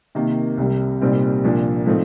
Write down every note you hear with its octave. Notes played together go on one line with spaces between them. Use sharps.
C3 D#3 A#3
C2 C3 G3
C2 A#2 G3 C4 D#4
C2 A#2 F3 A#3 D4
A2 F3 A3 C4 D#4